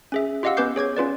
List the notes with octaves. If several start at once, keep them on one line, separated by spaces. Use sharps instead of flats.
C#4 G#4 E5
F4 G4 D#5 F5 F#5 E6
B3 C#4 B4 D6 G6 C7
G#4 C#5 D6 G#6
C#4 F4 B4 D5